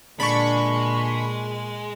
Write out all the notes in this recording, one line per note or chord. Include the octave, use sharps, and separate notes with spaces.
A#2 D3 G#3 D4 B5 C#6